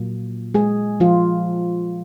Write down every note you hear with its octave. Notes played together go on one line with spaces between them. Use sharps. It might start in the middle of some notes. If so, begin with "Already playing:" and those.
Already playing: A#2 F#3 A#3
G#3 G#4
F3 F4